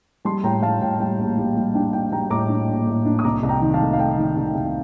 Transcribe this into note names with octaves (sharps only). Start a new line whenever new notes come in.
G3 A5 C6
A2 G5 A#5
G3 F5 A5
A2 G5
G3 G5
A#1
G3
G3
D4 G5
D4 G5
G3 G5 A#5
A2 A#5 D6
D4
A#1
A2
D4
D#6
C2 A#5 D6
C2
G5 A#5
D#3
F5 A5
A3
F5
A3 G5
D#3
C2
C2